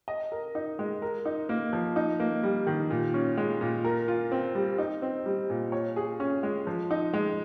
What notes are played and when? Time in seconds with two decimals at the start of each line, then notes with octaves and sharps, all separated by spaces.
0.08 D#5
0.32 A#4
0.55 D#4
0.79 G#3
1.02 A#4
1.25 D#4
1.49 A#3
1.73 F3
1.96 D#4
2.20 A#3
2.43 G3
2.67 D#3
2.90 A#2
3.14 C#4
3.37 G#3
3.61 A#2
3.84 A#4
4.08 F4
4.32 C4
4.55 G3
4.78 D#4
5.02 C4
5.26 G3
5.50 A#2
5.72 C#5
5.96 G#4
6.20 C#4
6.43 G#3
6.67 F3
6.91 D#4
7.13 G#3